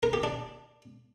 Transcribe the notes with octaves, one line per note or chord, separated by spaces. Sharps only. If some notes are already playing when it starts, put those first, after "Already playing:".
A#4
G4
D4